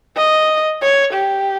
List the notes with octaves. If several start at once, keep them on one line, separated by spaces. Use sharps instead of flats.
D#5
C#5
G4